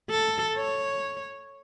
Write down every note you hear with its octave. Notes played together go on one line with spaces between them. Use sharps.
A4
C#5